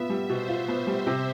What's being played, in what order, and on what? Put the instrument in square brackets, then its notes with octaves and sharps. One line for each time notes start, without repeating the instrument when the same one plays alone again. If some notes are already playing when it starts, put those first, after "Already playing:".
Already playing: [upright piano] B3 F4 [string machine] E5
[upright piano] G3
[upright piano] B2 [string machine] C5
[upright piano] F4
B3
G3
C3